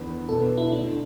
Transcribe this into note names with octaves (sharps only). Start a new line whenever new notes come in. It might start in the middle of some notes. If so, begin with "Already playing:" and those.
Already playing: E2 D3 B3 B4
B2 B3 D4 A4
E4
D2 D3 A3 D4